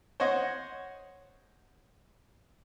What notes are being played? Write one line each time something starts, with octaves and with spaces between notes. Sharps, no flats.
C5 C#5 D#5 F#5